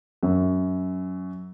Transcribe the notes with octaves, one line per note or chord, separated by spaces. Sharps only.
F#2